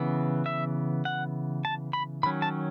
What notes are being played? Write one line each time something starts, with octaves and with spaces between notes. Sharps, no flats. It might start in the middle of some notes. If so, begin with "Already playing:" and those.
Already playing: C#3 E3 B3
E5
F#5
A5
B5
D#3 F#3 C#4 B5
A5